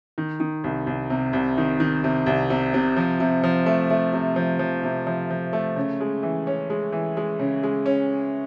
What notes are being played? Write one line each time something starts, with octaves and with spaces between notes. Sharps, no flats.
D#3
D#3
C2
C2
C3
C2
D#3
D#3
C3
C2
C3
C3
F3
C3
F3
A3
A3
C3
F3
F3
C3
F3
F3
A3
C#3
G#3
E3
C#4
G#3
E3
G#3
C#3
G#3
C#4